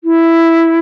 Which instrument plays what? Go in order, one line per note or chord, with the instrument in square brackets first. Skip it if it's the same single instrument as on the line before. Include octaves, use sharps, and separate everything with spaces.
[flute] E4